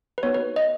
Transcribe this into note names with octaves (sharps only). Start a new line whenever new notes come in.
B4
B3 D#4 F#4 C#5
B4
D#5